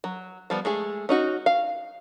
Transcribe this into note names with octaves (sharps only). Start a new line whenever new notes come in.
F#3
F3 G3 B3
G#3 A3 G#4
C#4 D#4 F#4
F5